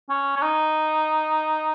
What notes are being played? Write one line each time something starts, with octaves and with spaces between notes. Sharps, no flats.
C#4
C#4
D#4